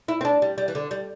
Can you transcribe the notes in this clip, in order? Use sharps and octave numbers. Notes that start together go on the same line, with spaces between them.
E4
C4
D4
G3
G3
E3
D3
G3